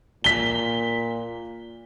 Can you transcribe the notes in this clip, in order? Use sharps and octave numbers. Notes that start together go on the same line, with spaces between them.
A#2 B6 G7